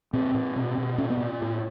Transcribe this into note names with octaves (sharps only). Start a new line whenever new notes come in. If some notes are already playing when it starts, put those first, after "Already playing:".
A#2 C4
A#2
B2
B2
A#2 C#4
B3
A#2
A2